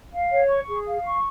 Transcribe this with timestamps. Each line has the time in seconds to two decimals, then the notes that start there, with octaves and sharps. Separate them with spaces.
0.13 F5
0.30 C#5
0.49 C#6
0.68 G#4
0.86 F5
1.04 C#6